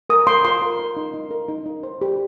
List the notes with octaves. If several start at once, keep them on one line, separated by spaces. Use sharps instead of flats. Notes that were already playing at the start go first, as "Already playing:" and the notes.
A#4 D#6
A#4 C6
F4 C6
A#4
A#4
D#4
D#4
A#4
D#4
D#4
C5
G4